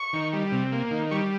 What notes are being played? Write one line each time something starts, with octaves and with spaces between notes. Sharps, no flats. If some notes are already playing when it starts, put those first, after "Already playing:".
Already playing: C#6
D#3
G3
C3
A#3
D#3
G3 C#6